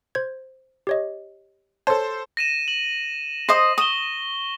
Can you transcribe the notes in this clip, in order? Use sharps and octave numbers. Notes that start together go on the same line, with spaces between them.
C5 G#6
G4 C#5 D#5
A4 C5 C#5 A5
A#6 D#7 E7
F#7
C5 D#5 D#6 A#6
C#6 D#6 E7 G7